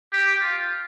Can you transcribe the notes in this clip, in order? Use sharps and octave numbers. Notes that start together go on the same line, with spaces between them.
G4
F4